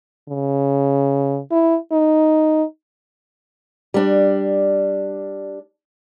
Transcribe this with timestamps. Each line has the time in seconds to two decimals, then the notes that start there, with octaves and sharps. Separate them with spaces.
0.28 C#3
1.51 E4
1.92 D#4
3.94 G3 D4